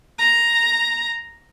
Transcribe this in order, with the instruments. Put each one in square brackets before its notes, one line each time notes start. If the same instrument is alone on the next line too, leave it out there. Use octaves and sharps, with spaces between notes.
[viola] A#5